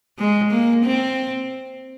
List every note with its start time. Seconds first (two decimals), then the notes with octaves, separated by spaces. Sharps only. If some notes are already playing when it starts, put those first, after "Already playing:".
0.19 G#3
0.51 A#3
0.84 C4